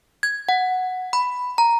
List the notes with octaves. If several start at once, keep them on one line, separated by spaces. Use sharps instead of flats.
G#6
F#5
B5
A#5